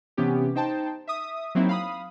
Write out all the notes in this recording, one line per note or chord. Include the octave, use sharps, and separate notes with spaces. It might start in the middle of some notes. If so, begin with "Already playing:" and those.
C3 E3 B3 C#4 G4
D#4 C5 G5 A5
E5 D#6
F#3 A#3 C4 D#4 E4
F5 B5 D#6